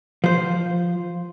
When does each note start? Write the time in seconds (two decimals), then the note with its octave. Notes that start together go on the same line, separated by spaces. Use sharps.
0.24 F3 C5